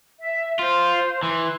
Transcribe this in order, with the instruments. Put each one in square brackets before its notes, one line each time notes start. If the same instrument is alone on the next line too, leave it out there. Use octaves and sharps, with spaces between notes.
[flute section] E5
[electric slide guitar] F4 [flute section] C5
[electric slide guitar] E3 [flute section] C6